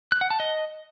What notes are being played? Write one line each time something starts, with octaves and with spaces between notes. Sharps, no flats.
F#6
F#5
A5
D#5